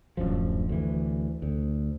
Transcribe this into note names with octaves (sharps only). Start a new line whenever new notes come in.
D1 F#2 F3
D2 E3
D2